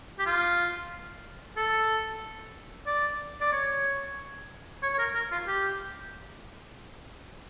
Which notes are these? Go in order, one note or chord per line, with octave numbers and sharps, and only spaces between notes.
G4
F4
A4
D5
D5
C#5
C#5
C#5
A#4
A#4
F4
G4